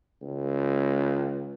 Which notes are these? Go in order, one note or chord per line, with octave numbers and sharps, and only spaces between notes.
C#2